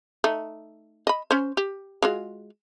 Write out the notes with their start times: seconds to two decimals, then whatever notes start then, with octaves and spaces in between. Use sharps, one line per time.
0.24 A3 D#4
1.07 D#5 B5
1.31 C#4 C5
1.57 G4
2.02 G#3 F4 F#4